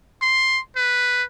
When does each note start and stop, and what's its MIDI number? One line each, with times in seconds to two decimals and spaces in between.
0.22 0.60 84
0.77 1.23 71